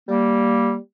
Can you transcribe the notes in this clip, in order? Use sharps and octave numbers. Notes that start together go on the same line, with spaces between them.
G3 A#3